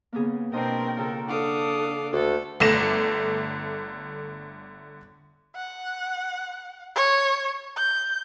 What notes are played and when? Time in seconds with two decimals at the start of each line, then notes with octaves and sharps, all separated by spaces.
0.13 C#3 A#3 B3 G#4
0.53 B2 C4 D4 A#4 C5 D#5 G5
0.97 C#3 F4 A4
1.28 D4 A4 F5 F#5 D6 D#6
2.13 D2 A3 A4 D5
2.60 G1 D3 A3 A#6 E7
5.55 F#5
6.95 C#5
7.77 G6